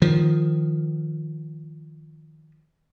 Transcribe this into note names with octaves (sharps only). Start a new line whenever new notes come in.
D#3 F3